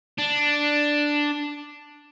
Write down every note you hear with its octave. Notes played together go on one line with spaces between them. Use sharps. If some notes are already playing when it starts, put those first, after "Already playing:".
D4